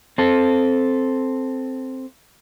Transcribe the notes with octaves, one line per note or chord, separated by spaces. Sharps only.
C4 A4